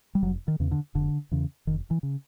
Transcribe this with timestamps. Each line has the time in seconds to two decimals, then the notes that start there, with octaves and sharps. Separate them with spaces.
0.15 G3
0.22 F1 F#3
0.48 D#3
0.60 E2 C#3
0.71 D3
0.95 F1 D3
1.32 E2 C#3
1.67 F1 D#3
1.91 E3
2.03 C#3